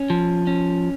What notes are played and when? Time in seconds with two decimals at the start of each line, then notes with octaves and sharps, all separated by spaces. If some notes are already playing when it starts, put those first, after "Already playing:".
Already playing: C#4
0.10 F3
0.47 C#4